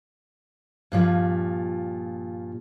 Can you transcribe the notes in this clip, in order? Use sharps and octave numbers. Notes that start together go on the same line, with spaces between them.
G2 A#2 F3